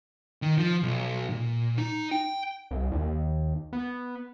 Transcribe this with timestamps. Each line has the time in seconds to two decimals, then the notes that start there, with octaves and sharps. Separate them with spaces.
0.42 D#3
0.58 F3
0.83 B1
1.30 A#2
1.78 D#4
2.11 G5
2.71 C2
2.92 D#2
3.73 B3